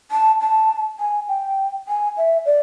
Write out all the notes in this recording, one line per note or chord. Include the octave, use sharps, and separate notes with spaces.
A5
A5
G#5
G5
G#5
E5
D5